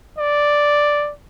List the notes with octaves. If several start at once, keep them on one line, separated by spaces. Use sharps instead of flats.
D5